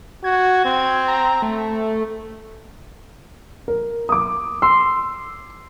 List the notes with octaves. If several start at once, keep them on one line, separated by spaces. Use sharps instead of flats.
F#4 G#6
C4 G#6
A#5
A3
A#4
D6 D#6
C6 E6